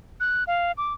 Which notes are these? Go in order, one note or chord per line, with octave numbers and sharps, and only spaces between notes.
F#6
F5
D6